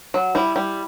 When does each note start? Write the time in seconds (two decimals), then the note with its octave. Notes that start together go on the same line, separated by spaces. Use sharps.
0.14 F#3
0.35 G3 E4
0.56 G3